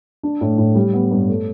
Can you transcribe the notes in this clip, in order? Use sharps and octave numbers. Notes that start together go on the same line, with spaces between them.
D4
A2
A2
G3
B3
G2
A3